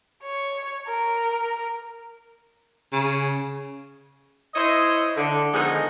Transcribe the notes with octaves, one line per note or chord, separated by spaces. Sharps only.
C#5
A#4
C#3
E4 C5 C#5 D#5
D3
D3 D#3 F3 G#3 B3 D#4